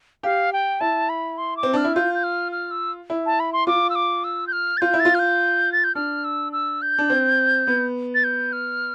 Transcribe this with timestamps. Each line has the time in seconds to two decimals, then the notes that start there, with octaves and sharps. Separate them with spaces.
0.23 G4 F5
0.53 G5
0.81 E4 A5
1.09 B5
1.38 C6
1.57 D6
1.63 C4
1.73 D4 F6
1.84 E4
1.96 F4 G6
2.15 G6
2.23 F6
2.52 F6
2.71 E6
3.10 E4
3.26 A5
3.40 B5
3.53 C6
3.67 F4 D6
3.90 E6
3.95 D6
4.24 E6
4.47 G6
4.53 F6
4.77 A6
4.81 F4 G6
4.94 E4
5.00 A6
5.05 F4
5.15 F6
5.19 G6
5.73 A6
5.84 G6
5.95 D4 F6
6.24 E6
6.53 E6
6.82 G6
6.98 D4
7.10 C4
7.67 B3
8.15 A6
8.24 G6
8.53 F6